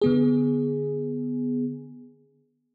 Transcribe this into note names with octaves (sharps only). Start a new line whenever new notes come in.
D3 B3 G#4